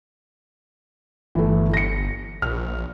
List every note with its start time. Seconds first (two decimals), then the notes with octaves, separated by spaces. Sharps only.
1.35 G1 E3 A3
1.74 A#6 C#7
2.42 A#1 F6